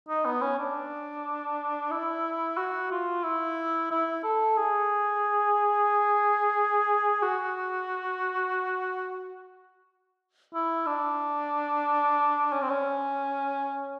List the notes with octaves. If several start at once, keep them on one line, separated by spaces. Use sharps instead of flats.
D#4
B3
C#4
D4
E4
F#4
F4
E4
E4
A4
G#4
F#4
E4
D4
C#4
C4
C#4